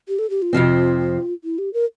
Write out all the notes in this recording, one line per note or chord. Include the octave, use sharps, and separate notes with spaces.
G4
A4
G4
F4
F2 C3 F3 C4
E4
G4
A#4